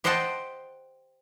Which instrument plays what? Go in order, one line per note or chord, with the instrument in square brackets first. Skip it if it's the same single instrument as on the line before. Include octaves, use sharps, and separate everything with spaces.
[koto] G4 C5 D#5 F#5 G5 A5